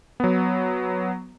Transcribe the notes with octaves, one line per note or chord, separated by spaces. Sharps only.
F#3 B3